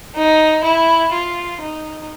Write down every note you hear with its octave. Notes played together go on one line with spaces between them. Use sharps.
D#4
E4
F4
D#4